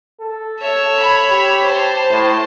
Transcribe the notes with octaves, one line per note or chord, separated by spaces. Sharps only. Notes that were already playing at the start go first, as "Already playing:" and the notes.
A4
C#5 E5
B5
G4
C5 A5
A2